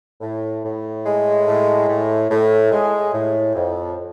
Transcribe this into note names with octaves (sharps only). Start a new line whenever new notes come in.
A2
A2
G#3
A2
A2
A2
G#3
A2
F2